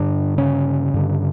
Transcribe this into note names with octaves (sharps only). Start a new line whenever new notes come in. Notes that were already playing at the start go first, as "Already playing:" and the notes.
Already playing: G2 D3 D4
C#3 C#4
G2 D3